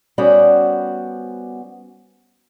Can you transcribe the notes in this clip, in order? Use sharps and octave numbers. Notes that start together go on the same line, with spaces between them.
G3 B3 C#4 F#4 C5 D5